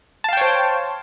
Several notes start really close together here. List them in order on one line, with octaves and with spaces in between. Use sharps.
A5 F5 G5 C#5 C5